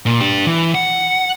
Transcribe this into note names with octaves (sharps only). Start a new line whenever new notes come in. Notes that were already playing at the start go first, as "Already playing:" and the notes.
A#2
D4 G4
E3
F#5